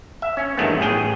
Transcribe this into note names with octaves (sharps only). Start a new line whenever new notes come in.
E5
C#4
E2 G2 D#3 A3 B3
A1 A2 G#4 G5